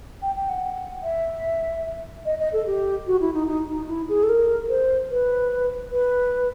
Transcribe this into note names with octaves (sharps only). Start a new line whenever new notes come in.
G5
G5
F#5
E5
D#5
D#5
A4
G4
F#4
E4
D#4
D#4
D#4
E4
G#4
A4
A#4
C5
B4
B4